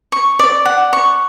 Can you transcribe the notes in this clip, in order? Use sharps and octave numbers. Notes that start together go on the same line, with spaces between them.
C#6
D5
F#5
C#6